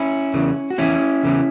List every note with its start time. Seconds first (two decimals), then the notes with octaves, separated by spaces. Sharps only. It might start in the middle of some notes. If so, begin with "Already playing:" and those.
Already playing: C#4 E4
0.34 E2 C#3 E3
0.70 F#4
0.78 E2 C#3 E3 C#4 E4
1.23 E2 C#3 E3